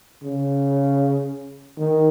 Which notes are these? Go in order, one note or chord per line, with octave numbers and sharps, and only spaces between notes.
C#3
D#3